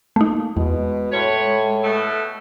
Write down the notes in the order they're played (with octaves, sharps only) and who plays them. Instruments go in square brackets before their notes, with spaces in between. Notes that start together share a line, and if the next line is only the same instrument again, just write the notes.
[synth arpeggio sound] A3 D#4 [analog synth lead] A#3
[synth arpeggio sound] E2 [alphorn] B2 [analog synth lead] G#3
[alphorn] A2 [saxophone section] F4 B4 C#5
[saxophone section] B2 A3